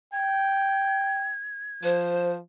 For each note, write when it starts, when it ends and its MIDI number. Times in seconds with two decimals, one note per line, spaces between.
0.13 1.32 79
0.13 1.98 92
1.83 2.41 53
1.83 2.32 72